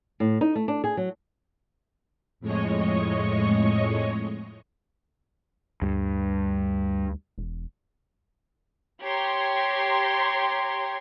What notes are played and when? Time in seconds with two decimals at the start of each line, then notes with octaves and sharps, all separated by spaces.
0.20 A2
0.41 D#4
0.55 A3
0.68 D4
0.84 G#4
0.97 F#3
2.40 F2 A2 G#3 C#5 D#5 C#6
5.82 D2 G2
7.38 E1
9.02 G4 C#5 A#5 C6 G#6